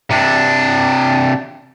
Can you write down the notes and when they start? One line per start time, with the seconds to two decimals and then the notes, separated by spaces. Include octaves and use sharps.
0.11 C3 D4